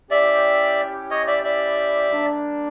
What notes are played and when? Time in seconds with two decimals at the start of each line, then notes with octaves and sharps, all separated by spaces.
0.11 C#4 E4 G4 D5 E5
1.11 C#5 D#5
1.27 D5 E5
1.44 D5 E5
2.11 G3 A#3 D4